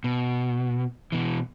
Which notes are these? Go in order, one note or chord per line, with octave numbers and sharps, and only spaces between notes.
B2
B2 E3